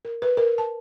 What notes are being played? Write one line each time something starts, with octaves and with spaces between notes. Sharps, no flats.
A#4
B4
A#4
A5